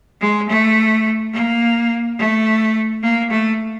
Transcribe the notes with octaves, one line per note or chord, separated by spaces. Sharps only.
G#3
A3
A#3
A3
A#3
A3